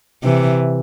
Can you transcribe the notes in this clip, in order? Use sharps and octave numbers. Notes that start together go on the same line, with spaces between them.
C3 E3